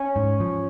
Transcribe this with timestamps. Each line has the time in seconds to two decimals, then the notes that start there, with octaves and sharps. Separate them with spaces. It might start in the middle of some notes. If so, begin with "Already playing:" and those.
Already playing: C#4
0.16 G#2
0.40 F3